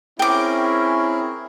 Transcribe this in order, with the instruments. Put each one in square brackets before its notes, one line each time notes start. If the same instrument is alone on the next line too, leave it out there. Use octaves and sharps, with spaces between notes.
[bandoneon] C4 G#4 A#4 [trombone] C#4 [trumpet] E4 [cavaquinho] G5 D6